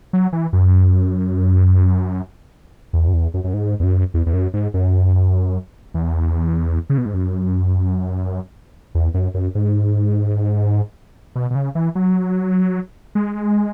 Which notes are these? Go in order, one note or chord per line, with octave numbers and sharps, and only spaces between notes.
F#3
E3
F#2
E2
F#2
E2
F#2
F#2
G#2
E2
F#2
E2
E2
F#2
G#2
F#2
E2
C#3
B2
G#2
F#2
E2
F#2
F#2
G#2
B2
B2
C#3
E3
F#3
G#3